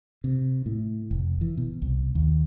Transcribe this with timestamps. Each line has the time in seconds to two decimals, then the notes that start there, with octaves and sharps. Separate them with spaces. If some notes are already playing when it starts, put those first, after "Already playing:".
0.24 C3
0.66 A2
1.11 F1
1.41 E3
1.57 B2
1.82 C2
2.15 D#2